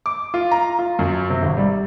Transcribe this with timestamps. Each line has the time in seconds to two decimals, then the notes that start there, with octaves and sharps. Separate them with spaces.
0.06 D6
0.34 F4
0.51 A#5
0.79 F4
0.99 F#2
1.30 C3
1.42 G#1
1.57 G3